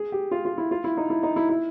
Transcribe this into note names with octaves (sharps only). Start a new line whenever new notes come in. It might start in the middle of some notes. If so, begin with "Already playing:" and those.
Already playing: G#4
G4
F4
F4
E4
F4
E4
D#4
E4
D#4
E4
E4